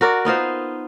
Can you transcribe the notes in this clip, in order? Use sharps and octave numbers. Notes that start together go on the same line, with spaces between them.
F#4 A#4 D5
B3 D#4 F4 C5